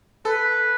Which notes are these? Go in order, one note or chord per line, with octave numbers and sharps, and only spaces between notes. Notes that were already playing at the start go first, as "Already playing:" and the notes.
A4 B4